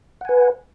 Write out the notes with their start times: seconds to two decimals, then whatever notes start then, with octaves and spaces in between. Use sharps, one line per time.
0.21 F#5
0.25 G#5
0.29 B4